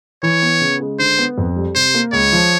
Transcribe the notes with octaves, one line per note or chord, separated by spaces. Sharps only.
E3 C#5
B3
C#3
G#3
D3 C5
B3
F2
G3
C3 C5
A#3
C#2 C#5
F3